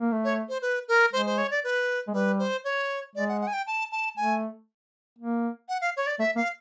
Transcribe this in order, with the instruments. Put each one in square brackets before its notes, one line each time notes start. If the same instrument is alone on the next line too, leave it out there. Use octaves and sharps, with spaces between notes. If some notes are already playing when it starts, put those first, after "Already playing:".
[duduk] A#3
A3
[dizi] C#5
C5
B4
A#4
[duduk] G#3 [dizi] C5
[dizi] C5
C#5
D5
B4
[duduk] G#3
[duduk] G3 [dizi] B4
[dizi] C5
C#5
[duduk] G#3 [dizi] D5
[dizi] F#5
F#5
G#5
G5
A5
A5
[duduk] A3 [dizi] G#5
[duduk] A#3
[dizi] F#5
F5
C#5
D5
[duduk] A3 [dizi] E5
[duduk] A#3 [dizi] F5